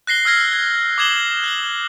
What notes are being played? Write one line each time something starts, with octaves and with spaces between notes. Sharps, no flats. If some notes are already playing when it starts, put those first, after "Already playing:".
F#6 A#6 C7 G7
E6 F6 G#6 A#6
G#6
D6 D#6 G#6 E7 F#7 G7
F#6 F#7 G7